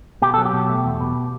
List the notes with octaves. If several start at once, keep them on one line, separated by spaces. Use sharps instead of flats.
B2 G4
F#3 A4
G4
B2
A3
E2
B2